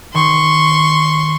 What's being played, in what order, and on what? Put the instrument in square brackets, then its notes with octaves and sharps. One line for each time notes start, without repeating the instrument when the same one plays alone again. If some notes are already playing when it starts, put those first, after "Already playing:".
[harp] D#3 [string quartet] C6 C#6